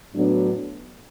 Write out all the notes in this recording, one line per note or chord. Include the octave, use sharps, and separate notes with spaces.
A2 F#3 B3 D4